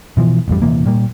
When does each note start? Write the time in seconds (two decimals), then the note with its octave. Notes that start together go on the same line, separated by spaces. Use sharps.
0.17 B2 E3 F3
0.48 A1 F2 G3
0.62 D#1 C3 E3 A#3
0.86 A#2 G3 A#3